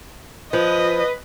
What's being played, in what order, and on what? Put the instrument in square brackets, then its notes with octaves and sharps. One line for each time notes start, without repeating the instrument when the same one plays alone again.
[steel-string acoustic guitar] F3 [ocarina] F4 [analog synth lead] B4 [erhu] D#5